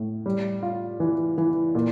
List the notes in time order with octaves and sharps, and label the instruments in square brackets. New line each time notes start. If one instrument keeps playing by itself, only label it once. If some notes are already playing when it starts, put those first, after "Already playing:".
Already playing: [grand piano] A2
G3
F4
E3
E3
A#2